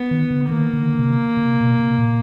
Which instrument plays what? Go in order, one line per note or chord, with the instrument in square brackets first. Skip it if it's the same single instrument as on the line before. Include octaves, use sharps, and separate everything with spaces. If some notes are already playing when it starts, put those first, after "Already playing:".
Already playing: [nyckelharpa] B3
[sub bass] D#3
D3
[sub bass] D#3 [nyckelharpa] A#3
[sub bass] D3
D#3
D3
C3
C#3
C3
B2
C3
A#2